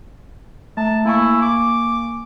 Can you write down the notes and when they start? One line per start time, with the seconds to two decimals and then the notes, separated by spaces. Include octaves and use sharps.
0.77 A3 A5
1.06 A#3 E4 G#5 C#6
1.42 D6